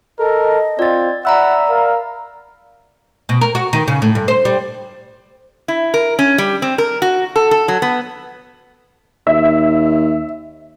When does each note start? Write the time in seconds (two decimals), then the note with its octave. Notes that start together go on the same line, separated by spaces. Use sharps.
0.19 A4 A#4 D#5
0.79 C4 F4 D5 A6
1.25 D5 E5 F#5 A#5 B5 E6
1.70 A#4 F5
3.29 B2
3.41 A#4
3.55 F#4
3.73 D#3
3.88 C#3
4.02 A2
4.15 G2
4.28 C5
4.45 G3
5.68 E4
5.94 A#4
6.19 C#4
6.38 G3
6.62 C4
6.78 A#4
7.02 F#4
7.36 A4
7.51 A4
7.68 F#3
7.82 B3
9.27 D#2 E5